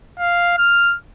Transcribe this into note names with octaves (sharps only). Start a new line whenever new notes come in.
F5
F6